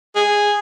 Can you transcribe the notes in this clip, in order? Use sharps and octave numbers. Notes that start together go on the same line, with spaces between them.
G#4